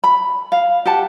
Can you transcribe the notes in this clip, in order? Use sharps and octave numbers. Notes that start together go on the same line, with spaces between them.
B5
F5
G4 F#5 A5